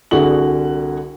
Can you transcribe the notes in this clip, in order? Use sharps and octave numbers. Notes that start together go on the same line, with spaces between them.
C2 D3 F#4 G#4 F#7